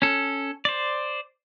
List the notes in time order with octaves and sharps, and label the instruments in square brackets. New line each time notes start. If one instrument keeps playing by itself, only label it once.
[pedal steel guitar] C#4 A4
C5 D5